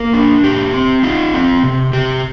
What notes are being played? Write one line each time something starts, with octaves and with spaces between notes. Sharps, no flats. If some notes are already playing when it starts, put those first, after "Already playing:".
Already playing: A#3 A#4
D4
A#2 G4
C4
D#4 F4
C4
C3
C3 G4